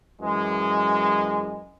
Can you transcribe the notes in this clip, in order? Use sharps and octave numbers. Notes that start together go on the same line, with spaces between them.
F#2 E3 G#3